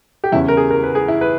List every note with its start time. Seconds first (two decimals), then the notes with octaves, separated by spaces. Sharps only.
0.24 G4
0.32 E2 C#3 G3 C#4 E4
0.48 A#4
0.57 G#4
0.70 A#4
0.83 B4
0.95 G#4
1.08 E4
1.21 B4